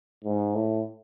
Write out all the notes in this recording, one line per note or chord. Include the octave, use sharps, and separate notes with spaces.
G#2
A2